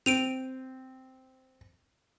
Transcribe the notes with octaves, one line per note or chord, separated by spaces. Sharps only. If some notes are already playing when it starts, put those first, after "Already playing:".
C4 D7 D#7 F7